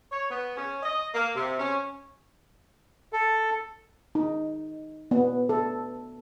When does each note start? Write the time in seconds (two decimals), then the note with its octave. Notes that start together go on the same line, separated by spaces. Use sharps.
0.12 C#5
0.31 B3
0.56 C#4
0.83 D#5
1.14 A#3
1.35 C3
1.59 C#4
3.13 A4
4.15 D#4
5.11 B3
5.49 A4